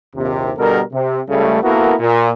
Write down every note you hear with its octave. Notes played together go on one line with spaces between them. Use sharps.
A#1 D#2 C3
B2 D3 G3 A4 A#4
C3
C#2 C#3 G3 A3
A#3 B3 E4 F#4 A4 A#4
A#2